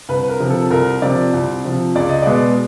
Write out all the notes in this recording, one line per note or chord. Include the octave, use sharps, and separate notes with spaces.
C2 B4
A#4
C3 F3
A4
C2 A#4
C3 F3 D5
C2
C3 F3
C#2 D5
D#5
B2 G#3 B3 D5